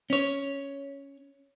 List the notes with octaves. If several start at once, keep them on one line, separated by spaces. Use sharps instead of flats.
C#4 C#5